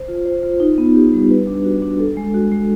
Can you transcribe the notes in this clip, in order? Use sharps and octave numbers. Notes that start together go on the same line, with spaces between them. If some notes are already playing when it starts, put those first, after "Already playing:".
Already playing: C5
F4
C5
F4
D#4
B3
G4
G3
B4
D4
F#4
D4
A4
G#3
F#4
G#3